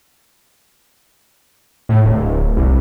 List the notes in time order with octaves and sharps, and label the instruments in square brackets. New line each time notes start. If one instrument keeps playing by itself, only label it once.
[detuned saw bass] A2
D1
C2